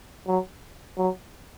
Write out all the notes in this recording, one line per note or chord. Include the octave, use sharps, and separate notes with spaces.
F#3
F#3